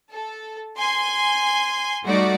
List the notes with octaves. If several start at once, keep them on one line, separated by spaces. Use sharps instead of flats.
A4
G#5 C6
G3 A3 D#4 F#4 D5